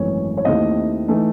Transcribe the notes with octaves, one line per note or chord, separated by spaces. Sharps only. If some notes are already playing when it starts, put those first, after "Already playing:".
Already playing: G#1 F#2 E3 A3 C#5
C#5
D#2 D#3 A3 C4 E4 D#5
E3 A3 D#4